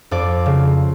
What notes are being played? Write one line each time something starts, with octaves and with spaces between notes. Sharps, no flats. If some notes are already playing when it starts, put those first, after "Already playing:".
F2 D5
C#3